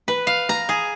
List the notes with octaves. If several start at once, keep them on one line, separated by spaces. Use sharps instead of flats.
B4
F5
A#5
G#4